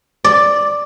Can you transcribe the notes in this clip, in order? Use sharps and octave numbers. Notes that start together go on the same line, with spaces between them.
D5